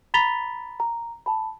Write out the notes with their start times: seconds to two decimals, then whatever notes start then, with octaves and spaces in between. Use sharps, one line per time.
0.14 A#5 B5 A6 B6 F7 G7
0.80 A#5
1.26 A5 B5